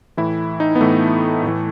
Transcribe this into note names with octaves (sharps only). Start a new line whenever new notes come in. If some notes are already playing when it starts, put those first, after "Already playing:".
A2 E3 E4
D#4
B3
A2 E3 A3
A2 E3